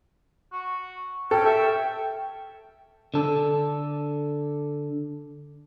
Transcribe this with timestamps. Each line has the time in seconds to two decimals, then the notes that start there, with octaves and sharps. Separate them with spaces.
0.53 F#4
1.31 C#4 A4 G5
1.45 E5
3.14 D3 A4